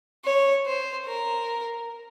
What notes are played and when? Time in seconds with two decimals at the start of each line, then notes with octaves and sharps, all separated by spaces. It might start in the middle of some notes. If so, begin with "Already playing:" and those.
0.25 C#5
0.66 C5
1.07 A#4